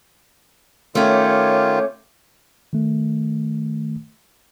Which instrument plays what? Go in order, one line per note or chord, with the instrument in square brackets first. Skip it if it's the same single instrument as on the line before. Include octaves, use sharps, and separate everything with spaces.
[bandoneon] D#3 F4 [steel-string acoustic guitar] A3 C#4 [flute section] C#5 D6 G6
[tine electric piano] D#3 A3